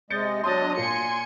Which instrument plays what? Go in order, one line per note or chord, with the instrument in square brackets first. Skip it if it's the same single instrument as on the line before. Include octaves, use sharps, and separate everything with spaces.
[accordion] C3 G#3 D#5 [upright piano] G6 A6 C#7
[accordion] F#3 D4 [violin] C#5 D#5 [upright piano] C6 D#6 A6
[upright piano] A#2 [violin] G#5 C#7 [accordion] C6